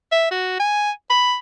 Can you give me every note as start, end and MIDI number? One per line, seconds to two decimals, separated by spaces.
0.12 0.28 76
0.31 0.57 66
0.60 0.91 80
1.10 1.36 83